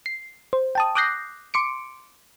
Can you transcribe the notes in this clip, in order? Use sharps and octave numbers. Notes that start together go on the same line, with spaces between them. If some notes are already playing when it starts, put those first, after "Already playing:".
C7
C5
G5 A5 D#6
D6 D#6 F#6 G6 A#6 C7
C6 D6 C#7 D7